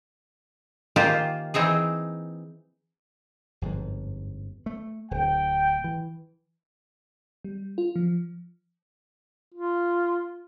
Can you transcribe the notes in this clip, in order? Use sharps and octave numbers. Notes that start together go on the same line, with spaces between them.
D#3 A#3 F4 G4 C5 G#5
E3 C4 D#4 G#4
G1 F2 G#2
A3
D1 G5
E3
G3
F4
F3
F4